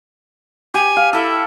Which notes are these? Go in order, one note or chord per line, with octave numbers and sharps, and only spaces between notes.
G4 G#5
F5
E4 A4